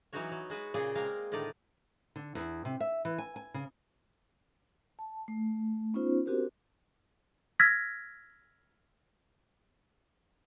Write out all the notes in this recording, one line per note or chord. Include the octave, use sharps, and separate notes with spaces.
E3 F#3 B3 D#4 F#4 C#5
F#3
G#3 F#4 B4
A#2 C#3 G#4 D5 D#5
G#3 A#3 C4 A#4 F5
A2 D3 D#3 D#4 D5
D3
E2
C3
E5
E3
G#5
G#5
C#3
A5
A3
B3 C#4 D#4 F4 C5
C4 D4 F#4 G4 A#4 C5
E6 F6 G#6 A#6 B6